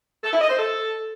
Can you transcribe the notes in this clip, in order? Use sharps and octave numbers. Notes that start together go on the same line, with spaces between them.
A4
E4
D#5
C5
A4